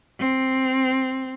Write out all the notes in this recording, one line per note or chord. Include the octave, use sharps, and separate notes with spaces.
C4